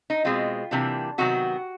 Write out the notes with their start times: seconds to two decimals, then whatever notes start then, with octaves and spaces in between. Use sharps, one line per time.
0.10 D#4
0.25 B2 G#3 C4 F4
0.71 C3 E3 G3 A#3 D4
1.18 C3 D#3 F#3 B3 F#4